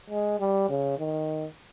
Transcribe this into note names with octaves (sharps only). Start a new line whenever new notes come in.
G#3
G3
C#3
D#3